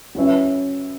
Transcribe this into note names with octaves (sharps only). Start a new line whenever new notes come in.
F#3 C#4 E4 B4 E5